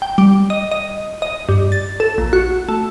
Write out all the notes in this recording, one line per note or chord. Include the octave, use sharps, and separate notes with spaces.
G5
G3
D#5
D#5
D#5
G2
A6
A4
A#1
F#4
A3